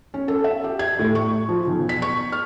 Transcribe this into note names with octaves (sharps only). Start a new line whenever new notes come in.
C#4
A4
E5
G4
G#6
A2
C#6
F3
B1
B6
C#6
F6